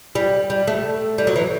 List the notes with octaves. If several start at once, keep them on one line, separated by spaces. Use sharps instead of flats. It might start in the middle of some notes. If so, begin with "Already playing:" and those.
G3
G3
A3
G3
F#3
E3